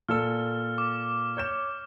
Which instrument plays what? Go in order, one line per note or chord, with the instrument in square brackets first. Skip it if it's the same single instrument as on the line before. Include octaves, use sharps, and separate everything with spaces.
[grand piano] A#2 A4 E6 [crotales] F6
[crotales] D6
[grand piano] C#5 G6 E7